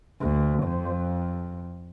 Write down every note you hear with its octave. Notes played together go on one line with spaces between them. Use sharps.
D2
F2